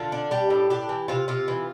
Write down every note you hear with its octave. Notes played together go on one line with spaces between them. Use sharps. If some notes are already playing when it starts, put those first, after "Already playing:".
Already playing: D3 F4
D4
G3 G4
A2
D4 G4
E3
C3 F4
C3 F4
E3